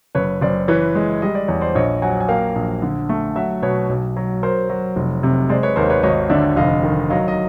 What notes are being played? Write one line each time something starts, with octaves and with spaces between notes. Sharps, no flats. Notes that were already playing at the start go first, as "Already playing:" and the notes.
F#1 B4 C#5
F#1 C5 D5
E3 B4 C#5
G#3
G3 D#5
D5
E2 C#5
C5 D5
A#1 C#5 D#5
F#3 F#5 G#5
G#5
A#3 F5 G5
A#1
D3
A3
F#3 E5 F#5
B2 B4 C#5
B1
F#3
F#3 A#4 C5
F#3
F1
C3
G#3 C5 D5
B4 C#5
D#2 A#4 C5
B4 C#5
G#1 C#5 D#5
D3 D5 E5
F1 D#5 F5
D#3
F#3 D#5 F5
D#5